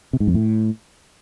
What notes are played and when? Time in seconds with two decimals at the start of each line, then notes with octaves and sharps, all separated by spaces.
0.13 C3
0.20 G#2
0.27 F2
0.34 A2